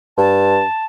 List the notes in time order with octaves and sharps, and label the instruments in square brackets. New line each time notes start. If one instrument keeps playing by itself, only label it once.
[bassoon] G2 [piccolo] A5